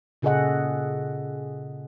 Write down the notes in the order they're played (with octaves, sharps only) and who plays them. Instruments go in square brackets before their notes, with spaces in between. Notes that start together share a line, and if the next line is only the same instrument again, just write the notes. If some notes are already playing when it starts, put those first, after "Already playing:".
[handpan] A#2 C#3 G#4 A4 D#5 F#5